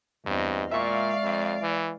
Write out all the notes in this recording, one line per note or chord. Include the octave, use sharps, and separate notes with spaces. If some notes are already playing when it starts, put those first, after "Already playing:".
E2 G2 C4 D#5
A#2 G#3 D5 E5 F5 C#6
F2
E3